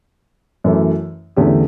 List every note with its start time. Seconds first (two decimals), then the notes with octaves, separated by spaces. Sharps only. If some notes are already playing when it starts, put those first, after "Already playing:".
0.64 F#2 E3 A3
1.36 E2 D3 A3 C#4 G4